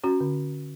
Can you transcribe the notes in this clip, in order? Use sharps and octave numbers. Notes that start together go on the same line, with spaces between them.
C#4 F#4
D3